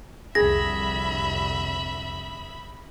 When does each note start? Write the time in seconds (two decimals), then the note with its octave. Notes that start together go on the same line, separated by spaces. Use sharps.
0.35 C2 F2 D3 G#4 E5 B5 A#6